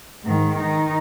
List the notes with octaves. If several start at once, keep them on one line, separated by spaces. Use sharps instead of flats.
G#2 D#3
D#3 D#4